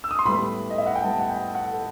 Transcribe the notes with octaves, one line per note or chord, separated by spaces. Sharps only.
E6
D#6
C6
A2 G3 B3 B5
D#5
E5
F#5
G5
A2 G3 B3 A5
F#5
G5
F#5
A4